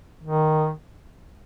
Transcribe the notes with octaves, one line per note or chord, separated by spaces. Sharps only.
D#3